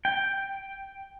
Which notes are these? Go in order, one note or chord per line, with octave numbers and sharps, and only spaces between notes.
G5